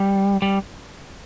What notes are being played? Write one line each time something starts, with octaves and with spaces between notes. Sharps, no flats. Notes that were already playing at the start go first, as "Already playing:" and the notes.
Already playing: G3
G3